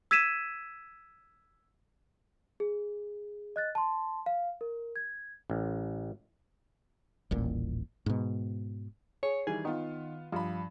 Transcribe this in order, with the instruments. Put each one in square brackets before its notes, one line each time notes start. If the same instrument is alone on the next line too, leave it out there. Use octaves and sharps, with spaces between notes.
[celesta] E6 G#6 B6 D#7 E7
G#4
D#5 F#6 A6
A5 C6
F5
A#4
G#6
[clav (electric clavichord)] A1
[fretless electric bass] D#1 A1 A#2
G#2 B2
[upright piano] G#4 [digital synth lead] C#5
[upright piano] D#3 E3 G3 [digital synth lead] G#4
[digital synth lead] D#3 [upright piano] B3 F4
[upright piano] G2 B5 [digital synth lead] F3